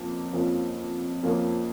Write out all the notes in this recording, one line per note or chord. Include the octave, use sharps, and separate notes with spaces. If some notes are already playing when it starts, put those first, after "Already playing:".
Already playing: F2 F3 A#3 C#4
F2 F3 A#3 C#4
F2 F3 A#3 C#4